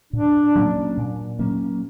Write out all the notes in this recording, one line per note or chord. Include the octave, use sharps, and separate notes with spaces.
A#2 D4
F#3 A#3 C#4
A#2
F#3 A#3 C#4